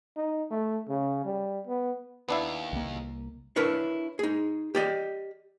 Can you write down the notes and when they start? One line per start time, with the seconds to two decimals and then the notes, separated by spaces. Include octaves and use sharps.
0.16 D#4
0.51 A3
0.89 C#3
1.25 G3
1.67 B3
2.29 D#2 B3 D4 E4
2.73 C2 A#3
3.56 D4 E4 A#4 B4 C#5
4.19 D#4 G#4
4.75 G4 D5 D#5